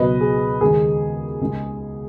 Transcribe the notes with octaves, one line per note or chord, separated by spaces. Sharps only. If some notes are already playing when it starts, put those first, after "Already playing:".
Already playing: C#2 B2 F#3 B4 D#5
G#4
D#2 C#3 G#3 G#4
C#2 C#3 G#3